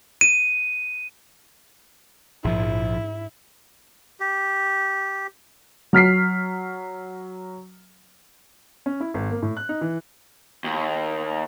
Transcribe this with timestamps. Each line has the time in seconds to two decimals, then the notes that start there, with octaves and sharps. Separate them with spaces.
0.21 D#7
2.44 A#1 G#2 F3 E4
4.20 G4
5.93 F#3 F6 B6 C7
8.86 C#4
9.00 E4
9.14 G#1
9.31 A#3
9.42 A2
9.57 F#6
9.69 D#4
9.81 E3
10.64 D#2